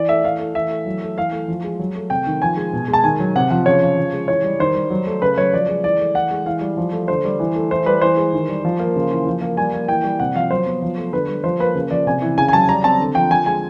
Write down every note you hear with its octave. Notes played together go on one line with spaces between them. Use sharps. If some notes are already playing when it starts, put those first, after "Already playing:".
Already playing: E3 D5
A3 E5
E3 F5
A3
E3 E5
A3
F#3
A3
E3 F5
A3
F3
G#3
F#3
A3
C3 G5
D#3
F3 G#5
G#3
B2
G#3
A5
D#3 G#5
F#3
C3 F#5
F3 F#5
C#3 C#5
F3
F3
G#3
E3 C#5
G3
D#3 C5
G3
F#3
A3
C#3 B4
F#3 C#5
F3 D5
G#3
E3 D5
A3
E3 F#5
G#3
E3 F5
G3
F3
A3
D3 C5
G3
E3
A3
E3 C5
G3 B4
E3 C5
G#3
D#3
G3
F3
A#3
C#3
E3
F3
A#3
G3 G#5
A#3
E3 G5
G3
C3 F#5
F3 F5
F#3 C5
B3
F3
A3
D3 B4
G3
F3 C5
A#3 B4
C#3
F3 D5
C3 G#5
E3
C#3 G#5
G#5
F#3 A5
G3 A#5
C4 A5
D3
F3 G5
F3 G#5
G#3 G#5